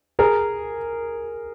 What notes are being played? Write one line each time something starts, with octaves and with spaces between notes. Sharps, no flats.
G#4 A#4